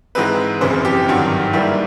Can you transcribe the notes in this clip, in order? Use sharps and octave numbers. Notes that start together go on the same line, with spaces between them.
G#2 E3 G#3 C4 B4
F#1 F2 C#3 E3 C5
G4
G#1 G2 D#3 F#3
G#2 E3 G3 A#3 E4